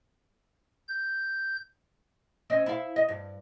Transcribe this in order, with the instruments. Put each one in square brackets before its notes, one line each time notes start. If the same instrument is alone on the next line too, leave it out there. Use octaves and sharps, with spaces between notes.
[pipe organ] G6
[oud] C4 C#4 D#5
E4 F5
D#5
G2